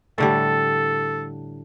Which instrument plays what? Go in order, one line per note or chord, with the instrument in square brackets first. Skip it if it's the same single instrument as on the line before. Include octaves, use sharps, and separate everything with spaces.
[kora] A2 D3 G3 [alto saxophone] A4